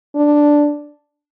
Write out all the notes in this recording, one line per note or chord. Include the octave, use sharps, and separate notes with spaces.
D4